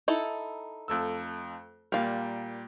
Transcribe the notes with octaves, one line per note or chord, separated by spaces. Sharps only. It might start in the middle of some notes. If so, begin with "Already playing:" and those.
D#4 E4 A4
F2 A3 E6
A#2 G3 A#4 F5